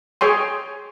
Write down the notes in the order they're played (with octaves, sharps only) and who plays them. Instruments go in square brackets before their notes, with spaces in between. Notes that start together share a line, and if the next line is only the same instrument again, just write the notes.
[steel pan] G#4 C#5 G5 C6